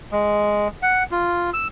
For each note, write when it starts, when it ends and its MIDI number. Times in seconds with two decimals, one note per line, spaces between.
0.12 0.68 56
0.82 1.03 78
1.12 1.50 65
1.54 1.67 88